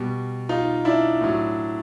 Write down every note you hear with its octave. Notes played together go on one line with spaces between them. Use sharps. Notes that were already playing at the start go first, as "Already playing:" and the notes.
Already playing: B2 G3
D#4 F4
D4 E4
A2 F#3